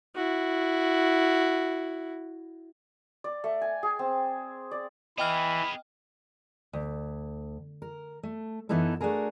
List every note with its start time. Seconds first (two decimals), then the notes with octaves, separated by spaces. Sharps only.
0.15 E4 F#4
3.24 D5
3.44 A3
3.62 G#5
3.83 G#4
3.99 C4
4.71 D5
5.18 E3 B3 G#4 D#5 G5 B5 F6
6.73 D2
7.82 A#4
8.23 A3
8.69 F#2 E3 B3 D#4 E4 A4
9.01 A3 D4 F#4 G#4 A#4